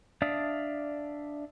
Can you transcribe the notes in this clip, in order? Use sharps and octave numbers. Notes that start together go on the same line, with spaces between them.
D4 D5 E5 F5 D#6